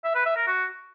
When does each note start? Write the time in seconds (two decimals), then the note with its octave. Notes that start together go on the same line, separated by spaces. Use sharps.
0.04 E5
0.15 B4
0.26 E5
0.36 A#4
0.47 F#4